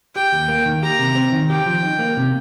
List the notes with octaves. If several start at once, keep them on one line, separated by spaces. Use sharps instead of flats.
G4 G5
D#2
A#3
D#3
G4 A#5
C3
C4
D#3
G4 G5
F3
D#4
A#3
C3